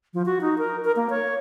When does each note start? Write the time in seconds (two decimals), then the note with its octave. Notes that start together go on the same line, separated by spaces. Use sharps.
0.14 F3
0.26 F#4
0.41 D#4
0.58 A#4
0.84 A#4
0.96 A#3
1.10 C#5